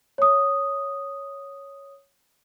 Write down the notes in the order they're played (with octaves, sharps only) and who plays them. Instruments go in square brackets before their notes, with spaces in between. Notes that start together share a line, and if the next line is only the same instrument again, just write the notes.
[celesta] C#5 D#6